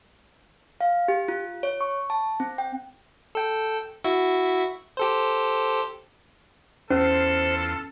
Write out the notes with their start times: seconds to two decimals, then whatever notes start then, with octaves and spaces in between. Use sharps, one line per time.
0.81 F5
1.08 G4
1.28 F4
1.63 C#5
1.81 C#6
2.10 A5
2.40 C4
2.58 G5
3.35 A4 G5
4.04 E4 F#4 E5
4.97 G4 A4 C5
6.91 E2 C#4 F4 A4 C5